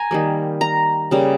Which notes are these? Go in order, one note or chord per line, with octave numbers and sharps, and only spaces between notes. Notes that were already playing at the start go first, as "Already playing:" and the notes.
Already playing: G#5 A#5
D#3 G3 A#3
A#5
C#3 G3 A#3